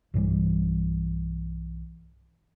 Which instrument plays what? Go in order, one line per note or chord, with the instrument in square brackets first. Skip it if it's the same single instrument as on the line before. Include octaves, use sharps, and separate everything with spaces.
[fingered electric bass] B1 G2 E3 G3